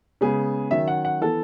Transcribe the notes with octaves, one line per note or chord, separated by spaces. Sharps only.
C#3 G#3 B3 G#4
D#3 F#3 C#4 E5
F#5
F#5
E3 B3 A4